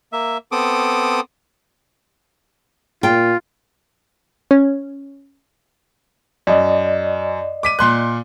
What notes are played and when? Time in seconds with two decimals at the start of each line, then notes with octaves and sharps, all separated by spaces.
0.13 A#3 E5
0.52 B3 C4 A4 D6 D#6
3.03 A#2 F4 G5
4.51 C#4
6.47 F#2 D5 D#5
7.63 D6 B6 D#7
7.79 A#2 C6 F#6